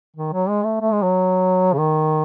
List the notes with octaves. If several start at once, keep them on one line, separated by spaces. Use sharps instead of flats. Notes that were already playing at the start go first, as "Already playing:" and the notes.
D#3
F#3
G#3
A3
A3
G#3
F#3
C#3
D#3